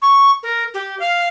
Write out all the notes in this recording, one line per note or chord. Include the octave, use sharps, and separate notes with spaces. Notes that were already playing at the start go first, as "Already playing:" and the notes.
C#6
A#4
G4
F5